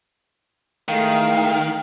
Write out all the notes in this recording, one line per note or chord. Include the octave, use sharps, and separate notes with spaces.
D#3 E3 G#3 A3 F5